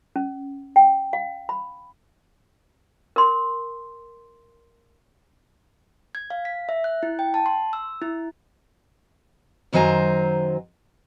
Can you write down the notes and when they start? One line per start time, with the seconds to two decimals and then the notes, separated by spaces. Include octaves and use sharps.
0.16 C#4
0.76 G5
1.13 F5
1.49 B5
3.16 A#4 C6
6.15 G#6
6.30 F5
6.45 B6
6.69 E5
6.84 F#6
7.03 E4
7.19 G5
7.34 A5
7.46 C6
7.73 E6
8.02 E4
9.73 F#2 D#3 F#3 C5 G#5 A#5